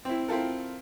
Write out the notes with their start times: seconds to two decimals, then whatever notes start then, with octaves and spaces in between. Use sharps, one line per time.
0.05 C4 E4
0.28 C4 E4 F4 A4 A#4